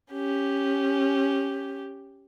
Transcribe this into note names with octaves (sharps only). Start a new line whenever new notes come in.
C#4 G4